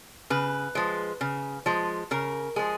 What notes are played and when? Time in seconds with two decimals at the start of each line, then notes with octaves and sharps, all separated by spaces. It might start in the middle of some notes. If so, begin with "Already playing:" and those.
0.30 C#3 B4
0.75 F3 G#3
1.21 C#3
1.66 F3 G#3
2.11 C#3 A#4
2.56 F3 G#3 G#4